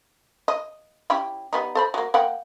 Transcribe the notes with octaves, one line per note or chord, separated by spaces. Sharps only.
D#5
C#4 E4 G4
G3 B3 D#4
A4 C5 B5
F#3 A#3
A#3 F#5 G5